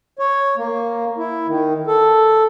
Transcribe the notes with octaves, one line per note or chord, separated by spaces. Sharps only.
C#5
A#3
E4
D#3
A4